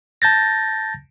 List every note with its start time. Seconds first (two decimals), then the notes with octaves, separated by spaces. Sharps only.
0.22 A5 G6 A6 A#6